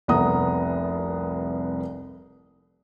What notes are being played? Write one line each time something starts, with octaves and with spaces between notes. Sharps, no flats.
F1 C2 B3 F#5 A#5 D#6